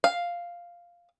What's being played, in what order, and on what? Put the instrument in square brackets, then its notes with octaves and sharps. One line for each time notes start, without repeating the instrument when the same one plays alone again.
[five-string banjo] F5